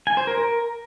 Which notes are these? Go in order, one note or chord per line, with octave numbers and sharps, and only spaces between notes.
G#5
C5
A#4
A#4